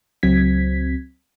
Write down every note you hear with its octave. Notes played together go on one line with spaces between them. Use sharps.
C#2 F#3 C4 G#6 B6